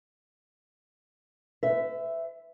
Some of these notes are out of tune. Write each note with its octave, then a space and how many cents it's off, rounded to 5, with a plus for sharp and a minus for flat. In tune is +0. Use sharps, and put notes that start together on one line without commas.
B4 +45 E5 +0